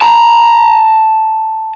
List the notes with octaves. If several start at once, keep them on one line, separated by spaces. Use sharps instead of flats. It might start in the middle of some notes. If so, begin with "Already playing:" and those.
A5 A#5